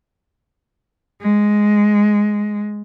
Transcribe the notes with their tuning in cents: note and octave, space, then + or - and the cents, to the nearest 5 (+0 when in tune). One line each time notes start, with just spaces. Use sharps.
G#3 +5